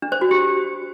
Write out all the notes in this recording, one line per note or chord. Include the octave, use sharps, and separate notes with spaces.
D4
C5
F#4
G4